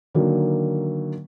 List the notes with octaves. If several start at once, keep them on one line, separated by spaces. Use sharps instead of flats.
D3 D#3 F#3 A#3